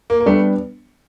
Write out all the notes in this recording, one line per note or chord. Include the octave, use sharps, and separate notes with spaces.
A#3
A#3
G3 A3 B3 D4